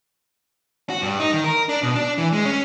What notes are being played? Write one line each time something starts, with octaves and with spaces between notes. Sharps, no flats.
F#4
G2
D#4
D#3
A#4
D4
B2
D4
E3
G#3
C#4